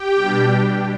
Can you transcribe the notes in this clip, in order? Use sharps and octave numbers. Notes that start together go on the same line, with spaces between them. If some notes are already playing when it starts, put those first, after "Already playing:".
Already playing: G4 G5
B2 G3 D4